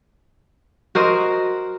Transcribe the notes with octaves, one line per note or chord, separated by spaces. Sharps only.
F#4 A#4 C5 D#5